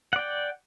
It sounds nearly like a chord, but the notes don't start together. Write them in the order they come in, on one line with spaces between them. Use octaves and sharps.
F#5 D5 G5